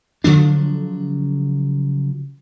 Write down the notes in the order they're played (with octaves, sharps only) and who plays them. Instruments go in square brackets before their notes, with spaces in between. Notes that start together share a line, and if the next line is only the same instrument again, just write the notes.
[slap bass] C#3 F3 F#3 D4